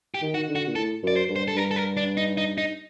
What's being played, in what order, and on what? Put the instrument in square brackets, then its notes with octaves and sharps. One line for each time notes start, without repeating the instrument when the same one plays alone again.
[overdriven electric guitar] G4
[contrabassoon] D#3
[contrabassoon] D#3 [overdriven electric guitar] F#4
[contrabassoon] D3
[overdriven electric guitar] F#4
[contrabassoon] A#2
[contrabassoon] A2 [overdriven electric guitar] A4
[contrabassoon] F#2 [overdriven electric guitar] D5
[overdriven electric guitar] C5
[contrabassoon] G2
[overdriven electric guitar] C5
A4
[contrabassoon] G2 [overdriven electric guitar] A#4
[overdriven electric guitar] A4
A#4
D4
D#4
D#4
D#4